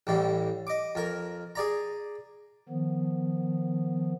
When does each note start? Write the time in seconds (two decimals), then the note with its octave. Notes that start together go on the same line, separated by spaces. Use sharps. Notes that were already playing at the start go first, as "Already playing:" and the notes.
0.07 A1 A2 G3
0.67 D#5 D6
0.95 F2 A#4
1.55 G#4 D5 A#5
2.69 D#3 F3 B3